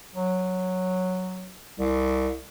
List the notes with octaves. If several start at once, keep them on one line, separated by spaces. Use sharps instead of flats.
F#3
C2